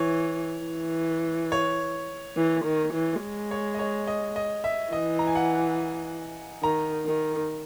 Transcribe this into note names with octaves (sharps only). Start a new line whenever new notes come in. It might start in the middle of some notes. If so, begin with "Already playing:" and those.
Already playing: E3 C#5
E3
C#5
E3
D#3
E3
G#3
C#5
D#5
C#5
D#5
D#5
E5
E3 D#5
A#5
G#5
F#5
D#3 A#5
D#3